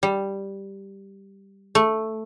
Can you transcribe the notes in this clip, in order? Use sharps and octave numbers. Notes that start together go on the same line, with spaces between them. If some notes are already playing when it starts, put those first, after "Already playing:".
G3
A3